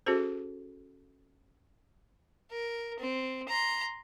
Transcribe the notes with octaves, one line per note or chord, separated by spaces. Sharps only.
C#4 F#4 G#4 A4 C5
A#4
C4
A#5 C6